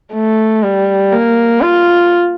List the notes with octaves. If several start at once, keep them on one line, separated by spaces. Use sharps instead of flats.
A3
G3
A#3
F4